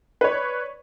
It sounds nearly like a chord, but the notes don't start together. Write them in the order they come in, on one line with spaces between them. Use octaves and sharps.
B4 C#5 D5